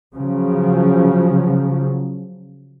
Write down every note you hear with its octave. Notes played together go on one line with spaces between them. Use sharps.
C#3 F3 F#3